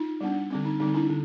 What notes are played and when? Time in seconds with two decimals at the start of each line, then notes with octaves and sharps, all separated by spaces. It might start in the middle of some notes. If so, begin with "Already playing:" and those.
Already playing: D#4 F4
0.21 G3 B3 D4
0.50 D3 G3 C4
0.65 D#4
0.80 D3 G3 C4 D#4
0.94 D4 E4
1.10 D3